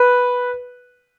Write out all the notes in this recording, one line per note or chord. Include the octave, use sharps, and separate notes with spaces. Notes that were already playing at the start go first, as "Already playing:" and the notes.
Already playing: B4